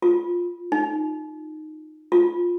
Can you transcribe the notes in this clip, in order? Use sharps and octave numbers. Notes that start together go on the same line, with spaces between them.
F4
D#4
F4